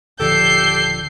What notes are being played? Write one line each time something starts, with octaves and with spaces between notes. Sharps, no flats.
D#1 D3 F3 G4 A4 G6 C7